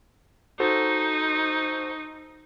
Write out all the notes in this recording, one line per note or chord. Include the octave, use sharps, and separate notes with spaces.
D#4 F#4 A4 C5